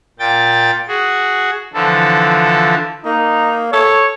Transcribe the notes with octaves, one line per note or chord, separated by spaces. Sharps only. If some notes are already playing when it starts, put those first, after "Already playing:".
A#2 G5 A6
F#4 G#4
D3 E3 F3 A4
A#3 D#4
A4 C#5